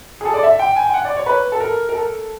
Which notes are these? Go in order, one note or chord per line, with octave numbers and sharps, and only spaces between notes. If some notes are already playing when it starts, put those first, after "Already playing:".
G#4
A4
D5
E5
G5
G#5
G5
F#5
D5
C#5
B4
A4
A#4
A#4
A4